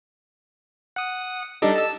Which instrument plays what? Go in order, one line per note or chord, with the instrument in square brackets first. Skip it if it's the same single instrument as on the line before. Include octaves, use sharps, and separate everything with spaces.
[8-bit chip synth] F#5 D#6
[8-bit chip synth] G3 D4 D#4 [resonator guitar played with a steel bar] G4 A4 D#5
[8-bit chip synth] A5 E6